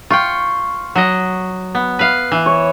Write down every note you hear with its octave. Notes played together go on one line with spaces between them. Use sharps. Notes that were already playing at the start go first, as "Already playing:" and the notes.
F4 G5 C#6
F#3 D#5
B3
B4 F5
E3
C#5